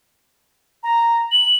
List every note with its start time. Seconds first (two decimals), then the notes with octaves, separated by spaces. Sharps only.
0.83 A#5
1.32 F#7